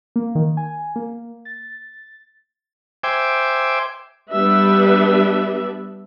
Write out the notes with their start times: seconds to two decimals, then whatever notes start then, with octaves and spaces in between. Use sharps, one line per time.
0.16 A#3
0.35 D#3
0.57 G#5
0.96 A#3
1.45 A6
3.03 C5 E5 G5 G#5 D6
4.31 G3 B3 D4 B4 E5